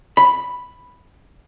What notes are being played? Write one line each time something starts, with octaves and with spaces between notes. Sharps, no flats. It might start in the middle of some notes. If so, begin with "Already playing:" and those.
B5